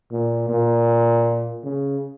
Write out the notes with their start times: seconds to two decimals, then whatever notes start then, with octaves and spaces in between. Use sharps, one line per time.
0.12 A#2
0.49 A#2
1.63 C#3